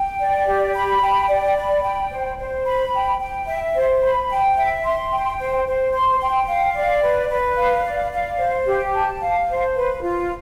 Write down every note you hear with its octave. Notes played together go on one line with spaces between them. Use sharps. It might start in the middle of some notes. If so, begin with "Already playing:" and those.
Already playing: G5
D5
G4
B5
G5
D5
B5
G5
C5
C5
B5
G5
G5
E5
C5
B5
G5
E5
C6
G5
C5
C5
C6
G5
F5
D5
B4
B4
F5
D5
F5
C5
G4
A5
F5
C5
B4
F4